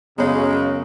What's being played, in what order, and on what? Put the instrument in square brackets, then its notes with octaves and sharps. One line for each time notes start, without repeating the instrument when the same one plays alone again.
[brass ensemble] F#2 C#3 [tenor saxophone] G#3 [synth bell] B3 C#5